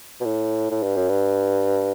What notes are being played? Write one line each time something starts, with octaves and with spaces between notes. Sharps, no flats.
B2
A2
A2
G2
F#2
G2